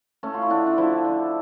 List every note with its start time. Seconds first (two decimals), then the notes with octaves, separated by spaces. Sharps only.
0.23 A3 C#4
0.34 F4
0.42 E4
0.50 D3 D4
0.67 D4
0.78 F3 E4
1.04 D3